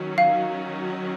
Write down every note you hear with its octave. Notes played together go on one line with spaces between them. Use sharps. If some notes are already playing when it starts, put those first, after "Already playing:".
Already playing: D#3 F#3 C#4
F5